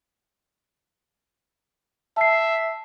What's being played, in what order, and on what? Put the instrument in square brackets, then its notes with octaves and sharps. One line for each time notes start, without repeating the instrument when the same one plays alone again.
[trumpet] E5 [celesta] A5 C7